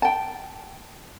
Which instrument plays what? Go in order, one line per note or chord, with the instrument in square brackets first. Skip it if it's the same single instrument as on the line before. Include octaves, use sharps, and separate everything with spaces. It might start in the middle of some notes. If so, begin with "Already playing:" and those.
[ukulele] G5 A5